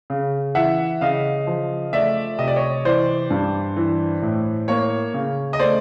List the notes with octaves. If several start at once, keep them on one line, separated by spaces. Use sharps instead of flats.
C#3
E3 E5 F#5
C#3 D#5 F5
F3
A3 D5 E5
C3 D#5
D5
C#5 D#5
E3 C5 D5
G2
E3
A2
A#3 C#5
C#3
D#5
A3 C5 D5